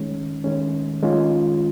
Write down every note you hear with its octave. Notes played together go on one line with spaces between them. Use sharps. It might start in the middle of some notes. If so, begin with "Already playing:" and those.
Already playing: D#3 G#3 C#4
D#3 G#3 C#4
D#3 G#3 C#4 F4